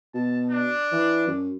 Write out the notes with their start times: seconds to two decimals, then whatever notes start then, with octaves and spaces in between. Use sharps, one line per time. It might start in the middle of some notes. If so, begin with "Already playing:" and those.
0.14 B2 A5
0.50 D4
0.92 E3
1.27 F#2